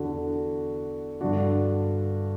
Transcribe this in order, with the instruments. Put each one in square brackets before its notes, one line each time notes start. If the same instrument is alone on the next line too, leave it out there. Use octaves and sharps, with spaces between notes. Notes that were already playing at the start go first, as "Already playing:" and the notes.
Already playing: [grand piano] E2 D3 D4 F#4
G2 D3 D4 F#4